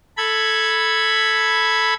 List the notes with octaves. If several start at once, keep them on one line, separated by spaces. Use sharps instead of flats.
A4 B5 G#6